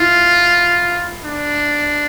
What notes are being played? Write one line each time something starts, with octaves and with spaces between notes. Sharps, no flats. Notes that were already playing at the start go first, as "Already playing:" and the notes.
Already playing: E4 F4
D4